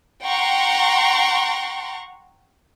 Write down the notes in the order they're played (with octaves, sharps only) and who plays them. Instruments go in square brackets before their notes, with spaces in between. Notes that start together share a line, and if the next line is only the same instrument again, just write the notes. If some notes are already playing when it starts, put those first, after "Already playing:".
[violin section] F#5 G5 A#5 C6 C#6